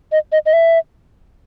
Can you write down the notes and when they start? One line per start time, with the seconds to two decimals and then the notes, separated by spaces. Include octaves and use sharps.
0.12 D#5
0.32 D#5
0.46 D#5
0.53 E5